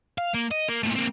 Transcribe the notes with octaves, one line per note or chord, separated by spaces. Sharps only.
F5
A#3
D#5
A#3
A#2 A3
A#3 C4